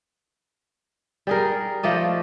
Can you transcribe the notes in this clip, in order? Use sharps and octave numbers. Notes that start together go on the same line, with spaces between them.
G3 G#4 A#4
F3 A3 D5 D#5